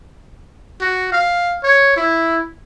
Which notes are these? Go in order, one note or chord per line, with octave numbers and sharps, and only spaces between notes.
F#4
F5
C#5
E4